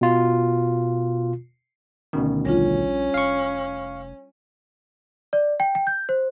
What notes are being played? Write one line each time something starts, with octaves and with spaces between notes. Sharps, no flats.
B2 F4
D2 B2 D#3 C#4
A#1 G3 C#4 D4 F4
F1 F5 C#6
D5
G5
G5
G6
C5